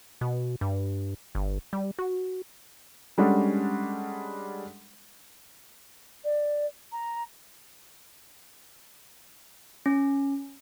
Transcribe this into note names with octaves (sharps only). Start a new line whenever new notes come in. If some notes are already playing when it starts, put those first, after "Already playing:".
B2
G2
G1
G3
F#4
G3 G#3 C#4 D4 A4 F#5
D5
A#5
C#4